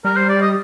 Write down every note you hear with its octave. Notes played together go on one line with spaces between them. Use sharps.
G3 A#4
C5
D5
D#5